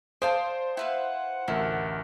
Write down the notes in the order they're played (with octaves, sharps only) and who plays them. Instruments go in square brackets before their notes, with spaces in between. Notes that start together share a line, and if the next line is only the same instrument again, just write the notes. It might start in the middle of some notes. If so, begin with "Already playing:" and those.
[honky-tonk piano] C5 [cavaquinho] D5 F5 A5 [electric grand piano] D#6 G6
[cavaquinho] E4 B4 F5 [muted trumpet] F#5
[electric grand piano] A1 D2 A#4 [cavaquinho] E4